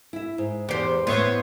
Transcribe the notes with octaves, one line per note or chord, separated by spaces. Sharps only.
E4 E5
G#2
E2 B3 G4 C5
A2 B3 C5 C#5 E5